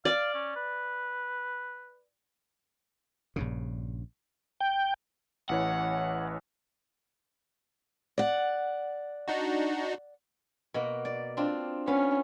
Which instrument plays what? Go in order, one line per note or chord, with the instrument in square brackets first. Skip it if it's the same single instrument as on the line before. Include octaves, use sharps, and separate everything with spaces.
[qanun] D5 [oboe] F5
[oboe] C#4
B4
[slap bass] A#1 G2 C#3
[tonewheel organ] G5
[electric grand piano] A1 E3 C#5 [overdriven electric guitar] F#5
[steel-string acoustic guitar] D5 F#5
[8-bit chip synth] D4 D#4 F#4
[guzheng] B2 A#3 F#5
D5
C4 D4 F4
[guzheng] B3 F5 [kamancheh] C#4